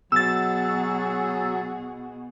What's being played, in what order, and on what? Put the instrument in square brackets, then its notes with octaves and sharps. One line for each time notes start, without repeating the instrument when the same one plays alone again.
[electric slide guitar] B2 [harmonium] F#3 [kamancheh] F#4 G#4 [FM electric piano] E6 A6